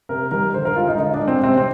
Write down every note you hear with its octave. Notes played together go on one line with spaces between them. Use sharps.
C3 A#4
D#3 G3 A#4
D3 C5
A#4
G#3 F4
D#4
D3 D#4
D4
G#3
C4
C3 C4
C4